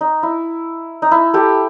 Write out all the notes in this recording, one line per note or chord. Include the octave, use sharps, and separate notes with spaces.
D#4
E4
D#4
E4
G4 A4